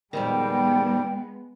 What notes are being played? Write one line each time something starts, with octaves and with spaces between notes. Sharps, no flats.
F2 A#2 D#3 G3 G#3 B3 G5